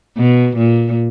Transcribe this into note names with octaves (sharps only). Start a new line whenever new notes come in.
B2
A#2